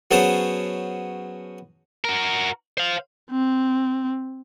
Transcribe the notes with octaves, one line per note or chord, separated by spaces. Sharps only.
F#3 B3 C#4 G#4 C5 A5
F#4 A#4
C5 F5
C4